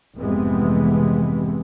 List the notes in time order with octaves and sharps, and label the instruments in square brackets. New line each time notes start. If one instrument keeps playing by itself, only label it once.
[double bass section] F1 G#2 C3 E3 G#3 B3